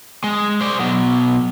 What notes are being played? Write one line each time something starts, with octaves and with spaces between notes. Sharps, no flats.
G#3
C5 D5
B2 F#3